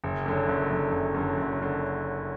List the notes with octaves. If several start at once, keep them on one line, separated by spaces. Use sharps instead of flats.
F#1
F#2 D3
F#1
F#2 D3
F#1
F#2 D3
F#1
F#2 D3